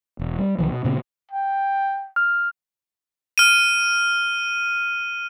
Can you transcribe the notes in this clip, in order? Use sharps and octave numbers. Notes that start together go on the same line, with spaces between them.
E1
G3
C2 D#3 F3
B2
A#2 C#3 B3
G5
F6
F6 D#7